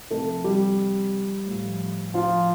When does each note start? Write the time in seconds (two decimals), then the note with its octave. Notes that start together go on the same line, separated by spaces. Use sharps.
0.11 C3 F3 A3 A4
0.44 G3 G4
1.46 A2 F3
2.14 F3 F4